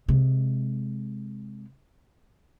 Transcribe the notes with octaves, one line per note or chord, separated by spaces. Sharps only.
C3 G#3